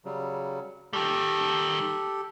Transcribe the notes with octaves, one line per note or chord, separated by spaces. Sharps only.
C#3 F#3 G3
D#3 G3 G4 A4